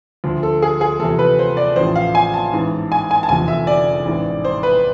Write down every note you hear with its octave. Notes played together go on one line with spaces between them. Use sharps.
D2 D3 F3
A4
G#4
G#4
E2 C3 F3 A4
B4
C5
D5
A1 A2 F3 C5
F5
G#5
A5
A1 G#2 E3
G#5
G#5
A5
F1 E2 D3 F3 G#5
E5
D5
A1 G#2 E3
C5
B4